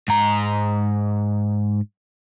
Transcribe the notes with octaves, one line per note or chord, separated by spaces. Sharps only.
G#2 A#5